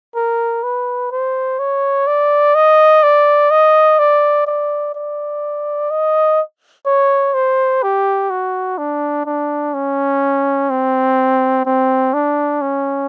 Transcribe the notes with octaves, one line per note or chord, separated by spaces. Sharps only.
A#4
B4
C5
C#5
D5
D#5
D5
D#5
D5
D5
D5
D#5
C#5
C5
G4
F#4
D4
D4
C#4
C4
C4
D4
C#4